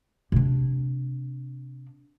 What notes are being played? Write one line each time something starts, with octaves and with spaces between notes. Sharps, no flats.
C3 D4